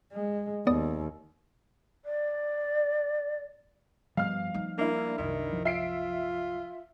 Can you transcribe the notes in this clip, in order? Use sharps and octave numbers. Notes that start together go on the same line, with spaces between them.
G#3
D#2 B3 D5 D#6
D5
G2 F3 G3 B3 F5 F6
A3 D#4
A#3 D4 E4
C2 F#2 D#3
F3
F4 E5 C7 D7